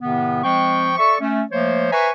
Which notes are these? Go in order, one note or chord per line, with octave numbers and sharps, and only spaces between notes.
A2 C3 D#3 B3
F3 G#3 C4 G5 C#6
A4 D5 E5 C#6
A3 C#4
F3 A3 A#3 C5 C#5
B4 C5 E5 G#5 A#5 C#6